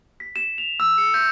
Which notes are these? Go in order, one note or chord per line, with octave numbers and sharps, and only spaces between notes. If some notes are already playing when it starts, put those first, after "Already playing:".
B6
E7
F7
E6
C#7
G6